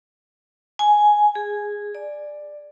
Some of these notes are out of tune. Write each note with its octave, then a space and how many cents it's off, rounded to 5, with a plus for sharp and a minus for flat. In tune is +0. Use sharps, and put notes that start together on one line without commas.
G#5 +5
G#4 -10
D5 +10